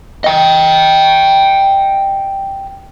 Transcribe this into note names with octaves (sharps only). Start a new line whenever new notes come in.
D#5 G5